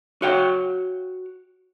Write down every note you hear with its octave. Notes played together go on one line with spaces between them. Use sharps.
F#4 C#5 F5 G5